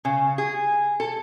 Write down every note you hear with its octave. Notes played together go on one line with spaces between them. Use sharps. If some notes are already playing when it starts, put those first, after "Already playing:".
C#3
G#4
A4